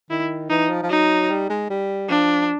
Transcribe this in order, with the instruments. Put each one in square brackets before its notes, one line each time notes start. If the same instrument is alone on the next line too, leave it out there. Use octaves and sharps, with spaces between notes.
[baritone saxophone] D#3 [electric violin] E4
[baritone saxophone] E3 [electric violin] D#4
[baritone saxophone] F3
F3
[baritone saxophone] F#3 [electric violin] D#4
[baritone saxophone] G3
G#3
G3
[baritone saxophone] F3 [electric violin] D4